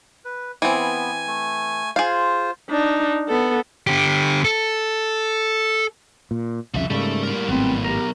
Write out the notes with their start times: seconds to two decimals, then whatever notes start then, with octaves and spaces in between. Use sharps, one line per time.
0.25 B4
0.62 E3 B3 C4 G#5
1.27 A3
1.96 F4 G#4 C5 F5
2.70 D4 D#4
3.28 B3 A4
3.87 D3 G4
4.45 A4
6.31 A#2
6.74 C2 F2 C#3 F3 E5
6.90 G#2 C#3 G3 A3 A#3 A4
7.23 A2 A#4
7.49 G#1 A2 F#3 B3 C4
7.85 G4 A#4